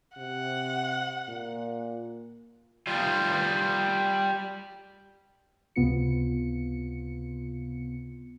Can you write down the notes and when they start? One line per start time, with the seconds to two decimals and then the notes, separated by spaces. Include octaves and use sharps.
0.18 C3 F#5
1.29 A#2
2.87 G3 F4
5.76 C#2 C3 B3 F4 C#7